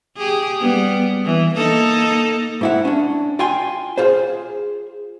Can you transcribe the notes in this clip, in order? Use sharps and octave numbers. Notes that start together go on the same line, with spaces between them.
G4 G#4
G3 B3
E3
A#3 D#4 A4
G#2 E4 F#5
C#4 D4
F4 G5 G#5 C6
F4 G#4 C5